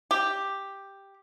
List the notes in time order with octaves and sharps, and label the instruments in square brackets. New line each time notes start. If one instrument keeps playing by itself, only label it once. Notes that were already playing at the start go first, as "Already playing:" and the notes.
[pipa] G4